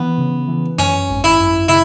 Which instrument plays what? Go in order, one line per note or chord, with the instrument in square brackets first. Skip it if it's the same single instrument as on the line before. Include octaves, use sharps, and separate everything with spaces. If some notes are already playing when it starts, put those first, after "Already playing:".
Already playing: [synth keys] E3 [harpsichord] B3
[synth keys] C#3
E3
[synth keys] F#2 [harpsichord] C#4
[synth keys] G#1
[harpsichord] E4
[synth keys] F#2
[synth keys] C#3 [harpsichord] E4